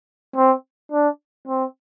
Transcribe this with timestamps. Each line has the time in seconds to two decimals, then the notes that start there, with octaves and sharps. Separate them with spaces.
0.36 C4
0.92 D4
1.48 C4